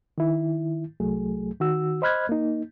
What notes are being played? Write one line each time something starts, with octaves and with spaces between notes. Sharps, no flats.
D#3 E4
C2 F#3 A3 G#4
D#3 F#4 E6
C5 D#5 B5 F6 F#6 G#6
A#3 D#4